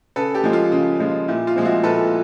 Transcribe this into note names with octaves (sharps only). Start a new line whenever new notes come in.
C#3 A4 B4
G4 A4
F3 G#3
F4
C#3
F3 G#3
A#2 E4
F4
F3 G#3 C4
E4 F#4
A#2 A4 B4